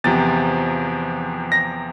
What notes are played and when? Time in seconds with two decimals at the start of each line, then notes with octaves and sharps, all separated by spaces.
0.04 E2 C3 F3 A6
1.52 A#6